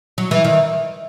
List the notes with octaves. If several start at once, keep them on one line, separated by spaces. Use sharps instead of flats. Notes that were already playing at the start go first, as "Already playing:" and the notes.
F#3
E3
D#3